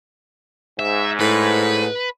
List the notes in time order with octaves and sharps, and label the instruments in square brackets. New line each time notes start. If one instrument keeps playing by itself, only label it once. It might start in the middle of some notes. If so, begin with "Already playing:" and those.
[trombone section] G#2 [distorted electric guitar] E5
[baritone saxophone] A2 [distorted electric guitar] B4